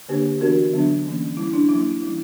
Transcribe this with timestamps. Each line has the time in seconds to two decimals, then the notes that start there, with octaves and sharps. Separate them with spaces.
0.09 D3 A#3 D4 G4 B4
0.40 E3 B3 D4 F#4 A#4
0.73 D3 F#3 B3 D4
1.05 E3 A#3 C#4
1.36 G3 C#4 E4
1.53 D4
1.69 F#3 A#3 D4 E4
2.01 E3 G3 C#4 E4